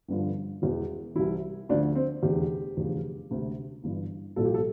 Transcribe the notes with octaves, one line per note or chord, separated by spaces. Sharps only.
G1 G2 D3 F3
E1 E2 E3
C2 C3 E3 E4
D2 D3 F3 D4
C4
F1 E2 D3 G4
F1 E2 D3 F3
E1 D2 C3
G1 G2 E3
C2 A#2 F3 A4
G4
A4